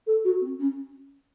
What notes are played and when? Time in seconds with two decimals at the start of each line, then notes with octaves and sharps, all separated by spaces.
0.06 A4
0.24 F#4
0.41 C4
0.59 C#4